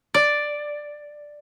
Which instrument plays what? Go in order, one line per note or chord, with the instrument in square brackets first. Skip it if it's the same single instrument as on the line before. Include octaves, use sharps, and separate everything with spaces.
[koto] D5